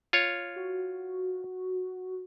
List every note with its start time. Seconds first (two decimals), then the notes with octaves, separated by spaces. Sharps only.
0.13 F4 C#5
0.56 F#4